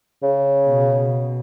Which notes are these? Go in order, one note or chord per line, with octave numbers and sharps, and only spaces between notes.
C#3
B2